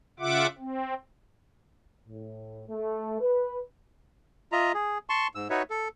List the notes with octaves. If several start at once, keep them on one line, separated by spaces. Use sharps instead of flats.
C#3 F4 E5 F#5 D6
C4
A2
A3
B4
F4 D#5 E5 A#5
G#4
A5 C6 C#6
G#2 E6
D#4 F#4 B4 C#5 E5
A4